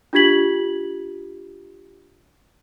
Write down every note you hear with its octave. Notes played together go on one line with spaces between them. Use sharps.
D4 F4 G4 G#6 B6 F#7